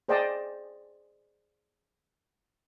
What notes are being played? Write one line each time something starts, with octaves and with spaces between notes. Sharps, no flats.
G#4 C5 D5 D#5 G5 A5